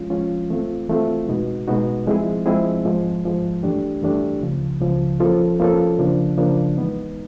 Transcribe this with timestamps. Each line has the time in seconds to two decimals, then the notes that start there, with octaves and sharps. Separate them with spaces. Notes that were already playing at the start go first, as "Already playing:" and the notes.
Already playing: F3 G#3 C#4 F4
0.10 F3 G#3 C#4 F4
0.50 E3 A3 C4 F4
0.89 E3 A3 C4 F4
1.28 B2 G#3 B3 D#4 F#4
1.67 B2 G#3 B3 D#4 F#4
2.07 F3 G#3 C4 E4 G#4
2.46 F3 G#3 C4 E4 G#4
2.85 G#2 F3 G#3
3.25 G#2 F3 G#3
3.63 G2 E3 A3 D4 G4
4.02 G2 E3 A3 D4 G4
4.41 C#2 C#3 F3
4.81 C#2 C#3 F3
5.20 F3 A#3 C#4 F4 A4
5.60 F3 A#3 C#4 F4 A4
5.99 C#3 F3 A#3 D4
6.38 C#3 F3 A#3 D4
6.77 E3 G#3 B3 D#4